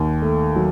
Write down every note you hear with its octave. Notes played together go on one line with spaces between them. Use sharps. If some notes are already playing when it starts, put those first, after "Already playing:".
Already playing: D#2 D#3
A3
F#3